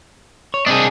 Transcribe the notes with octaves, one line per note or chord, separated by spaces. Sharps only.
C#5
C2 C4 D4 G#4 D#5